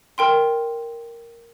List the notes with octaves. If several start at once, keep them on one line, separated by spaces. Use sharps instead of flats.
A#4 G5 C6